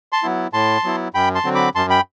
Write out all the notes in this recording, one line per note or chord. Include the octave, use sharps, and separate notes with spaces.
A5 C6
F#3 B3 E4
A2 A5 C6
F#3 B3 E4
F#2 G5 B5
A5 C6
D3 F#3 C4
B5 D6
F#2 A5 C6
G5 B5